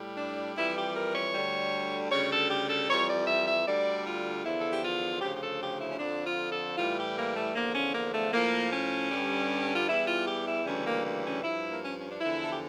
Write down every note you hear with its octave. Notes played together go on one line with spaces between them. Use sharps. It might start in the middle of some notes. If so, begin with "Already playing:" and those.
Already playing: A2 G3
D4
F2 E3 G3 E4
G4
A#4
C#5
D2 D3 G3
D2 C#3 G3 C#5
A4
G4
A4
F2 E3 G3 C#5
D5
E5
E5
D2 D3 G3 D5
F4
E2 D3 F3 E4
A4
G4
F4
D2 C#3 F3 G4
G4
A4
G4
E4
C#4
F2 D3 F3 D4
F4
A4
A2 E3 G3 F4
G4
A#3
A3
E2 D3 F3 A#3
C#4
A#3
A3
A2 F3 A#3
C#4
G2 D3 G3
F4
E2 E3 G3 E4
F4
G4
E4
D2 C#3 E3 G3 C#4
A#3
A#3
C#4
G2 F3 E4
A#3
C#4
C#4
D4
E2 D3 F3 E4
A4
G4